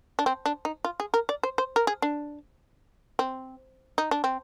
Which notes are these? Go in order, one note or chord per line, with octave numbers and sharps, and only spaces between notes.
D4
C4
D4
D#4
F4
G#4
A#4
D5
C5
C5
A#4
G#4
D4
C4
D#4
D4
C4